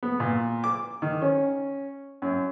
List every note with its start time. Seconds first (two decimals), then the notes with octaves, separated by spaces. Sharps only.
0.03 B3
0.20 A#2
0.64 D6
1.02 D#3
1.22 C#4
2.22 F#2